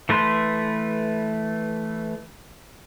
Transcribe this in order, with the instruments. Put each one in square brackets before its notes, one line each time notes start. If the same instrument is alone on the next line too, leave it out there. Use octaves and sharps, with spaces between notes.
[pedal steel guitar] E3 A3 B4 C6